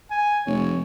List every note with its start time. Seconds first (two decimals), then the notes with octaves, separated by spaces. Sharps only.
0.10 G#5
0.47 F1 C#5